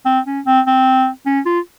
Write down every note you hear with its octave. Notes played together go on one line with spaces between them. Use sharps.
C4
C#4
C4
C4
C#4
F4